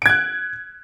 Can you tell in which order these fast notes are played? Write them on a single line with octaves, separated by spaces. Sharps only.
D7 G#6 F#6